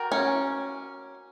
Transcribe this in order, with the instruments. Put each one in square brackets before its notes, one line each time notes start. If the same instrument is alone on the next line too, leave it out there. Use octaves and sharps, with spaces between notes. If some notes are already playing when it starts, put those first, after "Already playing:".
Already playing: [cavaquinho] F#4 A#4 D5 G5
[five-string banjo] C#4